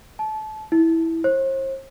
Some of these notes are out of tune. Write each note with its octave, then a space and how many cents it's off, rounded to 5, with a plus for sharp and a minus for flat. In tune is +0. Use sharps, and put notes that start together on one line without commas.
A5 -25
E4 -10
C5 +40